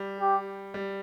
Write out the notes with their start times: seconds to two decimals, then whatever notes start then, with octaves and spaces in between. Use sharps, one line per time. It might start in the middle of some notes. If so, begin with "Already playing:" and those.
Already playing: G3
0.21 G4
0.74 G3